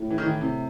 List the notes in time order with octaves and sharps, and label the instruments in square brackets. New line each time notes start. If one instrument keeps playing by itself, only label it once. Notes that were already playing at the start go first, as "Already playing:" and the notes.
Already playing: [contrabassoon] A2
[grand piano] E3
D#3
E3
C3